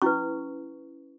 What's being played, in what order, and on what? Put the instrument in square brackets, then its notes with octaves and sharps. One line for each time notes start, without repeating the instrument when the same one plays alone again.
[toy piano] C#4 E4 B4 C#6